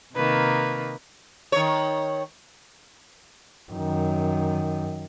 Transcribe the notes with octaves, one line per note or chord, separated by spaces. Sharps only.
C3 D#3 A#3 B4
D#3 C#5
F#2 D#3